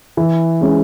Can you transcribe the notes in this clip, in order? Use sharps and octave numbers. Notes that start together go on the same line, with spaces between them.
E3
G#3 C#4